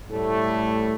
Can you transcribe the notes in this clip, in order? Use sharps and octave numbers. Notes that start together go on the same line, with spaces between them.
A2 G3 A3